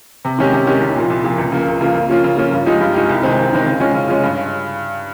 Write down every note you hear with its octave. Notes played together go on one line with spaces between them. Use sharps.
C3
D#3 G#3 C#4 G4
C3
D#3 G#3 C#4 G4
C2
A#2 F3
C2
A#2 F3
C#2
C#3 F3 A#3
C#2
C#3 F3 A#3
C#3
F3 A#3 C#4 F4
C#3
F3 A#3 C#4 F4
G2
F3 G#3 D#4 G4
G2
F3 G#3 D#4 G4
C2
C3 D#3 G#3 C4
C2
C3 D#3 G#3 C4
C#3
G#3 C#4 F4
C#3
G#3 C#4 F4
G2